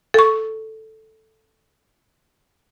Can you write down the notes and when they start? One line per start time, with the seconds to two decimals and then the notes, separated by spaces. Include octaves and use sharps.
0.14 A4 C#6